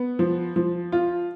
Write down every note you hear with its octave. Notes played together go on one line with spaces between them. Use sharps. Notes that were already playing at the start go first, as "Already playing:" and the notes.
Already playing: B3
F3
F3
F4